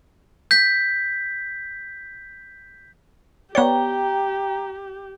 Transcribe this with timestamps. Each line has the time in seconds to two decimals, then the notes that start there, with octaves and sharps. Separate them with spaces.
0.51 G6 B6
3.55 B3 G4 C#5 D5 G5 A#5